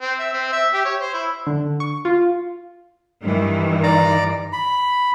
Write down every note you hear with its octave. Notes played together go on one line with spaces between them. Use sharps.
C4
E5
C4
E5
G4
C#5
C5
E4
D3
C#6
F4
G2 D#3 E3
D5 A#5 D6
B5